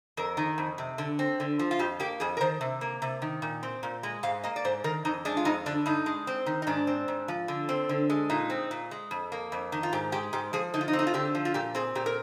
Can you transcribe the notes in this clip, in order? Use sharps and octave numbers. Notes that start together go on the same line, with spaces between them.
F2 A#4
D#3
F2
C3
D3
C4
D3
F3
F4
F2 G4
A#3 G4
F2 G#4
A#4
D#3 C5
C3
A#3
C3
D#3
A#2
C4
A#2
G#3
G#2 F5
A#3 D#5
D5
G#2 C5
D#3 A#4
F2 D#4
G#3 D4
F4
F2 D#4
D3 D4
G2 D#4
G#3
C4
D#3
D#4
G#2 D4
C4
G#2
F3
D3
C4
D3
G#3
A#2 D#4
C4
A#2
G#3
F2
A#3
F2
D#3
F4
G#2 G4
G#3 G4
G#2 G4
F3 G#4
D3 D#4
F4
D#4
C4
D#4
F4
D3 G4
F3
F4
A#2 G4
C4 G#4
A#2 G4
A#4